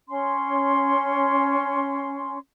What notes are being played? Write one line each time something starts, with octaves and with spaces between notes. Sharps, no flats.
C#4 C6